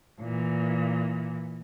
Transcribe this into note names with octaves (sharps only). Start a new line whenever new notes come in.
A#2 E3